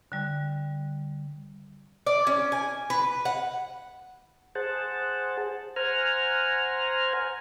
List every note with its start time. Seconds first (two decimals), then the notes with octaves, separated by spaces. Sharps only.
0.12 D3 G3
2.07 D5
2.27 C#4
2.52 G#5
2.90 B4
3.25 F#5
4.55 G#4 C5 F#5 A5
5.76 C5 F#5 G#5 A#5 F6